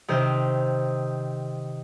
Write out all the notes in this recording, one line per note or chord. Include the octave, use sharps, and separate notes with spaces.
C3 D#3 C5